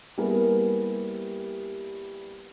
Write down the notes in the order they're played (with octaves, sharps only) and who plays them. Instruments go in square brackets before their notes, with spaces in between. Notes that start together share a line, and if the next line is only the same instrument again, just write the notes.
[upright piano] G3 A#3 B3 E4 G#4 A#4